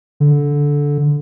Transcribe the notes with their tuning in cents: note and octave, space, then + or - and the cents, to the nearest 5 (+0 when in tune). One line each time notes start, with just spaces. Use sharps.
D3 -15